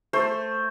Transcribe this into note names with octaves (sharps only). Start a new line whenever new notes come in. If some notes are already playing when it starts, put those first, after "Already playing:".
A3 C5